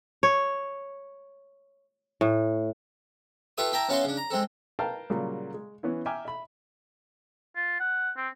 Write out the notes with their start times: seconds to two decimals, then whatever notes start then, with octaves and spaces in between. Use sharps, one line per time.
0.23 C#5
2.21 A2
3.58 F4 G4 A4 B4 E5 D#6
3.72 E4 E5 G5 A5 A#5
3.89 B3 C#4 E4 F#4 F5 C6
4.04 C#3 D4
4.17 A#5
4.30 G#3 C4 A4
4.79 A#4 B4 F5 G5 A5 A#5
5.10 A#2 C#3 F#3 G3 A#3
5.54 G#3
5.83 E3 B3 C#4 E4
6.06 E5 G5 G#5 A#5 D6 F6
6.25 E5 B5
7.56 F4
7.80 F#5
8.17 C4